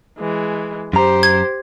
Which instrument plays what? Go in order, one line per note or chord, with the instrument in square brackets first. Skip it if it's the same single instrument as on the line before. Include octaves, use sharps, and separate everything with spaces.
[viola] E3 G#3
[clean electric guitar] F#2 A#5 [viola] G4 C5
[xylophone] G#6